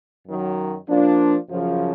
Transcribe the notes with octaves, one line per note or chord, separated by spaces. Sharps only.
F#2 D#3 F#3
F3 A#3 D4 F4
F#2 C#3 F3